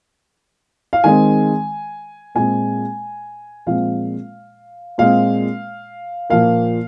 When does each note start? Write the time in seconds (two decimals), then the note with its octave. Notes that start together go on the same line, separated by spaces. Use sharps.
0.93 F5
1.04 D#3 G#3 C4 G#5
2.35 A#2 G#3 C4 G#5
3.67 A#2 F3 G#3 C4 F5
4.98 A#2 G#3 C4 F5
6.30 A#2 F3 A#3 F5